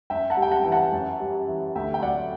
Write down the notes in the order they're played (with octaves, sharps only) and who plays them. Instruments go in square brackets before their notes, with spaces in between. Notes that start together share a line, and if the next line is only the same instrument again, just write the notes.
[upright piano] F#2 E5 G5
F#5 A5
G3
G5
F#5 A5
E3 G5
F#5 A5
F#2
G3
E3
D2 E5 G5
G5
F#3 D5 F#5